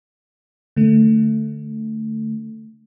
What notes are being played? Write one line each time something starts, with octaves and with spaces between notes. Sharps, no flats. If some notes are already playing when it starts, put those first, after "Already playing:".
D3 A3